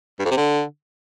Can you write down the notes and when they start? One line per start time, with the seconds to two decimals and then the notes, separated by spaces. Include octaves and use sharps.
0.19 G2
0.25 F2
0.31 C3
0.37 D3